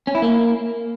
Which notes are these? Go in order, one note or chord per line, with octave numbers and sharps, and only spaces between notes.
C#4
E4
A#3